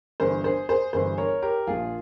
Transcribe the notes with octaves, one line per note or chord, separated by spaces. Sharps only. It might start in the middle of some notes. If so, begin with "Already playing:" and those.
G1 G2 E3 G#4 C5
G#4 C5
G#4 C5
G1 G2 E3 G#4 C5
A#4 C#5
G4 A#4
A#1 A#2 F3 F4 G#4